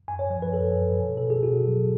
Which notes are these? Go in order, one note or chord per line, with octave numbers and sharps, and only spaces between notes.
F#2 G#5
C#5
F3 C#5
B4
F#2 A4
F#2
B2
B2 A4
G#4
B2 F#4
F#3